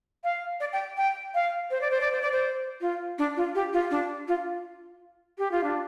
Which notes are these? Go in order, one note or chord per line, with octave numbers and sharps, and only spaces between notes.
F5
D5
G5
G5
F5
C5
D5
C5
D5
C5
D5
C5
F4
D4
F4
G4
F4
D4
F4
G4
F4
D4